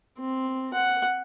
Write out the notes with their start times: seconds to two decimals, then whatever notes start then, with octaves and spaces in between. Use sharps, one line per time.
0.19 C4
0.74 F#5